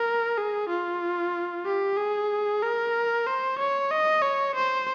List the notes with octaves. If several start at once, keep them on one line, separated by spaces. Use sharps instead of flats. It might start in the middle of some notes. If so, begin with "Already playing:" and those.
Already playing: A#4
G#4
F4
G4
G#4
A#4
C5
C#5
D#5
C#5
C5